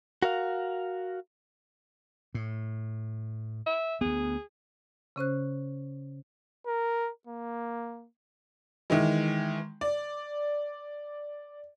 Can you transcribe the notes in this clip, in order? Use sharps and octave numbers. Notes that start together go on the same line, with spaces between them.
F#4 A#4 F5
A2
E5
D2 B3 G#4
C#3 C#4 C5 F#6
A#4
A#3
D#3 E3 G#3
D5